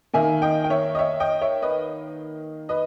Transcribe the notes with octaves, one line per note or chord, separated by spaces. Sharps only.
D#3 A#3 E5 G#5
D#5 G5
G5
C#5 E5
D#5
C#5 E5
D#5 G5
C#5 E5
B4 D#5
B4 D#5